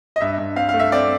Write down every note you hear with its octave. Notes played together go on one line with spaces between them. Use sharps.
D#5
G2 E5
G2
C4 F5
F5
A3
E5
C4 D5